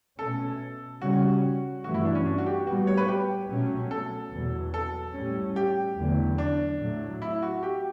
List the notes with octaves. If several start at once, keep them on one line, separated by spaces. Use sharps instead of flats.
B2 A3 C#4 A4
C#3 G3 C#4 F#4
G2 E3 A3 F#4
E4
D4
C#4
D4
F#4
G4
A2 G3 B3 F#4
C#5
B4
G4
B2 F#3 A3 C#4
A4
E2 B2 F#3
A4
A2 G3 C#4
G4
E2 D3 F#3 A3
D4
A2 F#3 A3
E4
F#4
G4